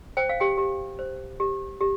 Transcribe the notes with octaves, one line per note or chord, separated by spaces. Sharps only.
C5 G5
F5
G4 G5
G4
C5
G4
G4